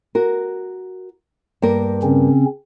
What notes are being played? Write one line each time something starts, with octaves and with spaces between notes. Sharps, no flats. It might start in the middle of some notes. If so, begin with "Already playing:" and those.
F#4 A#4
G2 A#3 A#4
C#3 C4 C#4